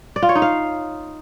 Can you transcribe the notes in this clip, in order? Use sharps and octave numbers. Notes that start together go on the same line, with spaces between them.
D5
F4
C#5
D#4
F5